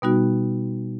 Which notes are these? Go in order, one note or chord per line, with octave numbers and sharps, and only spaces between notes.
B2 G3 B3 D#4 F#4